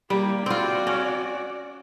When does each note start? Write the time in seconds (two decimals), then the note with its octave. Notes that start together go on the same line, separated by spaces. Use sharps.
0.10 G3 A#3
0.46 C4 F4 F#4 D5
0.87 C#4